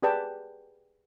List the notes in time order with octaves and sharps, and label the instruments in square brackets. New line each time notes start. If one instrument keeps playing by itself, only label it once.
[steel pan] G4 G#4 B4 D5 G5 A5